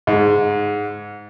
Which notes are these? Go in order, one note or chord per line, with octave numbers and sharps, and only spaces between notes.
G#2